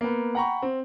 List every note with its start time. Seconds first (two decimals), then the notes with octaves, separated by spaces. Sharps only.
0.01 A#3 B3
0.35 F#5 G5 A#5 B5 C#6
0.62 C4